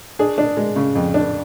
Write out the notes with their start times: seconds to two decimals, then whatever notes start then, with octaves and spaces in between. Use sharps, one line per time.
0.19 D4 G#4
0.38 D4
0.57 G#3
0.76 C#3
0.95 F2
1.14 D4